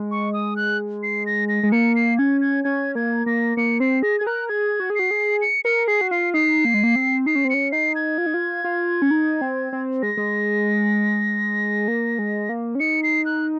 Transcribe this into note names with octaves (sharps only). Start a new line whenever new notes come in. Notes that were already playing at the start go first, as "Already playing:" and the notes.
Already playing: G#3
C#6
D#6
F#6
C7
A#6
A#6
G#3
A#3 C#7
C7
C#4 G#6
G#6
C#4 G#6
A#3 G#6
A#3 A#6
A#3 C#7
C4 C7
G#4 A#6
G#4 G#6
A#4 F#6
G#4 G#6
F#4
G#4
F#4 C7
G#4
C#7
A#4 C#7
G#4 C7
F#4
F4 C7
D#4 C7
A#3
G#3
A#3
C4
D#4 C7
C#4
C4
C#4 C#7
D#4 C7
G#6
F4
D#4
F4
F4
C#4
D#4
C4
C4
G#3 A#6
G#3
A#3
G#3
A#3
C#4
D#4 C#7
C7
F#6